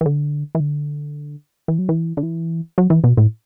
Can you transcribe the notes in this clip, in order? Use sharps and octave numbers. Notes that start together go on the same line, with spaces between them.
E3
D3
E3
D3
E3
F#3
E3
D3
E3
F#3
E3
B2
A2